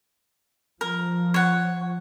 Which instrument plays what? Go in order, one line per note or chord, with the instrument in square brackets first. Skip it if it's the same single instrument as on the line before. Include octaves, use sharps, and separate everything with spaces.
[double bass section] F3 [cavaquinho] A#4
[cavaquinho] C#5 F#5